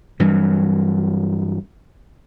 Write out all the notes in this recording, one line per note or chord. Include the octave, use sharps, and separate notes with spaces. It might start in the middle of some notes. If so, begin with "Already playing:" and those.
G2 E3 F#3 G3